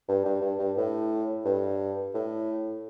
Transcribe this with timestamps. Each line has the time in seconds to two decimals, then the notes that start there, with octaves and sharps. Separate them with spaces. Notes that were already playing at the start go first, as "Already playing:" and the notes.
0.08 G2
0.25 G2
0.42 G2
0.59 G2
0.77 A2
1.45 G2
2.14 A2